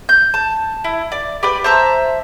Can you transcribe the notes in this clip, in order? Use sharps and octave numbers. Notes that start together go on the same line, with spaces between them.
G6
A5
E4
D5
G4 B4 D5
C5 E5 A5 A#5